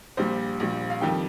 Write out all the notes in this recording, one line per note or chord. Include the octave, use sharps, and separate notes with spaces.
A#1 A#2 G3 C5
A#1 A#2 G3
F5
F2 D#3 G3 G5